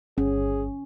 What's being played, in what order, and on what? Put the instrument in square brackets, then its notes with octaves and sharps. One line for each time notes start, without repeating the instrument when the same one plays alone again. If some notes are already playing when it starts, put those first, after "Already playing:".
[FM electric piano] G1 [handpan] C#4 [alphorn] G#4